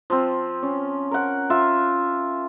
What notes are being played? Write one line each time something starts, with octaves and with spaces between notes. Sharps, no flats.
F3 C4
C#4
A#4 F#5
F4 E5